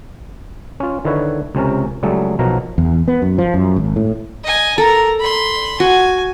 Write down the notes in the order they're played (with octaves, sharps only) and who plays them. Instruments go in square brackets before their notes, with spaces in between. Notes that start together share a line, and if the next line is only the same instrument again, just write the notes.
[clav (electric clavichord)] C#4 F4
D3 D#3 E4 B4 C#5
C#2 C3 C#4 A#4
C#2 F#3 G3 A3 G#4 A4
B1 B2 F3 F#3 A#4 A#5
[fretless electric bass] E2
B3
F#2
F3
F#2
G#1
A2
[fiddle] D#5 G#5
[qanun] A4 [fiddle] A#4 A#5
[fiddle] B5 C6
[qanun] F#4 [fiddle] G#5